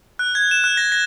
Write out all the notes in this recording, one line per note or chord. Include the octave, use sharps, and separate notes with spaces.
F#6
G#6
E7
F#6
A#6
A#6